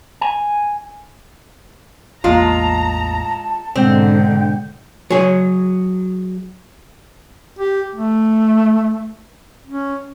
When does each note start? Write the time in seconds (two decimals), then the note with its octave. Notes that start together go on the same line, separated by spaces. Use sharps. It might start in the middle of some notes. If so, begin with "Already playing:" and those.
0.21 G#5
2.24 A1 E2 G#3 A#3 F4 A5 A#5
3.76 G#2 B2 D3 G#3 C4 F#5 G5 G6
5.10 F#3 G#4
7.59 G4
7.95 A3
9.66 C#4